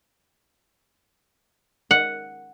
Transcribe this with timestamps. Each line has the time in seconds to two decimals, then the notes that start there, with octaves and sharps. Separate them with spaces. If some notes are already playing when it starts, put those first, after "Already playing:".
1.91 F#5